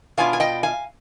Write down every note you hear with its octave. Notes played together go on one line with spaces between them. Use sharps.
B2 B3 D4 F4 F5 G#5
G#5
D#5 G5
F5 G#5